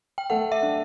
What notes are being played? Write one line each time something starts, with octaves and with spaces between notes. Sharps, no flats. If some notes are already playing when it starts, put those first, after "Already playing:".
G5
A3 F#5
E5
D4